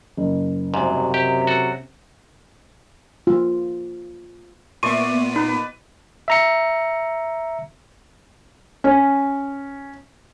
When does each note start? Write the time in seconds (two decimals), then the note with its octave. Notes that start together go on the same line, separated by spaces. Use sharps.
0.17 F#1
0.74 C2 G#2 C3 F#3
1.14 G4
1.47 F#4 A4
3.27 F4
4.83 A#2 B3 D5 E5 C6 C#6 D#7
5.36 D#4 B4
6.28 E5 A#5 C#7
8.84 C#4